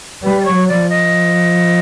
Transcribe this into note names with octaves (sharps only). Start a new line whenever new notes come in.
G3 B4
D5
C#5
F#3
D5
F3
D#5